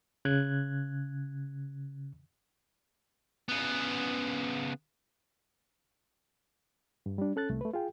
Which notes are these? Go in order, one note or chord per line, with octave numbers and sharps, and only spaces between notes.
C#3 F#6 G#6
C#3 B3
G2
G3 D4
C#4 A4 F#6 A6
C2 A3
A3 B4
F4 G#4 G5